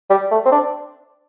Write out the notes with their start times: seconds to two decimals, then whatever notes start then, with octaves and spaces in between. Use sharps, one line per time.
0.10 G3
0.31 A3
0.46 C4
0.52 D4